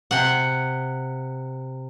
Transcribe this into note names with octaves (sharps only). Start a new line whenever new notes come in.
C3 F#5